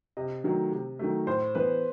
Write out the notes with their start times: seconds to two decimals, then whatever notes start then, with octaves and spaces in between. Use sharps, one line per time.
0.17 C3 D#5
0.44 D#3 F#3 A3
0.72 C3
0.99 D#3 F#3 A3
1.27 A2 C5
1.55 E3 B3 B4